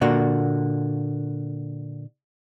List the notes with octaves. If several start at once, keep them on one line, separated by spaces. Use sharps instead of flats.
A#2 D3 A#3 F#4